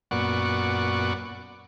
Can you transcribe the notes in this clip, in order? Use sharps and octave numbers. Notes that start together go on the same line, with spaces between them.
F#2 A#2 B3 D5 F#5 C#6